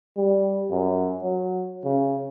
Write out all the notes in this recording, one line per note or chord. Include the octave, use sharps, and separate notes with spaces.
G3
F#2
F#3
C#3